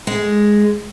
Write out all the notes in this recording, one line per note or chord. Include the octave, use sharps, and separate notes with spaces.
G#3